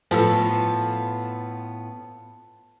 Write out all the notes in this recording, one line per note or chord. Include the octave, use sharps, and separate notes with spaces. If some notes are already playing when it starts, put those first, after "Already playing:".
A2 F3 B3 F4 A4 A5